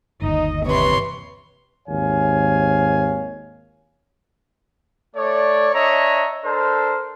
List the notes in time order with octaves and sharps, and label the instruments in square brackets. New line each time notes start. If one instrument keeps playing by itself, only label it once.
[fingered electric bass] G1 D#2 [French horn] D#4 [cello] D#5
[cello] C3 E3 [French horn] B4 [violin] C#5 C6
[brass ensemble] G#1 D#2 C#5 F5 G#5
[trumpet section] A3 C#5 D5
D4 C#5 D#5 E5 A#5
D4 A4 A#4 C5